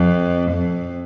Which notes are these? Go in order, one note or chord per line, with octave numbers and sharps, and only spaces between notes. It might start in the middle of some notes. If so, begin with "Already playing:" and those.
Already playing: F2
F2